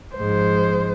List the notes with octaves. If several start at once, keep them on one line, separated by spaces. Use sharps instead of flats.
G#2 F3 G#3 C5